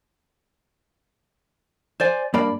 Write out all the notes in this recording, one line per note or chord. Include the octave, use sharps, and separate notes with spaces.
C5 D5 G#5
G2 A#3 D5 B5